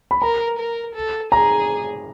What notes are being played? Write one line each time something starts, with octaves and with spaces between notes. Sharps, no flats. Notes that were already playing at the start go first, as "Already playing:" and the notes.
B5
A#4 A#5
A#4
A4
G#4 A#5